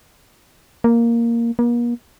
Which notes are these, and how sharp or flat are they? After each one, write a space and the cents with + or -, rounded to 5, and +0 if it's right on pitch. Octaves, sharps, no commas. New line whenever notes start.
A#3 +0
A#3 +40